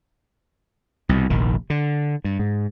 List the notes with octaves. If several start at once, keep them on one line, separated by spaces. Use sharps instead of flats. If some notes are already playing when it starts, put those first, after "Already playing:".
C2 B2
F1 A#1 D#3
D3
G2
G#2